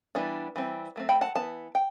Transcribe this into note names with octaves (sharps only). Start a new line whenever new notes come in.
E3 G3 B3 D4
E3 G3 C4
F#3 A3 C4
G5 B5
F#5 A5
E3 B3 A5
G5